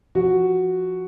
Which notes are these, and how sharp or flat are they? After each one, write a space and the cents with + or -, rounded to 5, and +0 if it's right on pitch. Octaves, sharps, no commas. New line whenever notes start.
F3 +0 F#4 +0